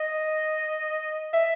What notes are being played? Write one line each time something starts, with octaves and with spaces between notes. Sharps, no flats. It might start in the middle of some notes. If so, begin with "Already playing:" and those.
Already playing: D#5
E5